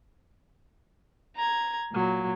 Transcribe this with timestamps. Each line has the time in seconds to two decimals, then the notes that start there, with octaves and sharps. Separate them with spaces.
1.36 A#5 G#6
1.93 A#2 F#3